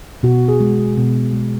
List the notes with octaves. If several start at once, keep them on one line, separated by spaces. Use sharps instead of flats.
B2 F#4
G#4
G#3
B2
G#3